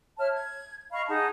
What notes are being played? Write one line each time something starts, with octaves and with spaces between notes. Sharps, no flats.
C#5 E5 A5 F6
G#6
D#5 F5 B5 C#6
D#4 G#4 F#5 A5